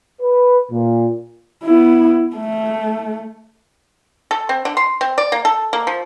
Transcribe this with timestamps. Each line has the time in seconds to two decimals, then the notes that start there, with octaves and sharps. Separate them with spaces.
0.21 B4
0.71 A#2
1.64 B3 E4
2.35 A3
4.31 A4
4.49 C4
4.65 D3
4.77 C6
5.01 C4
5.18 D5
5.32 A#3
5.45 A4
5.73 A#3
5.87 F3